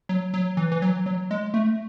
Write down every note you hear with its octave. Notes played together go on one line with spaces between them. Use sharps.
F#3
F#3
E3
E3
F#3
F#3
G#3
A3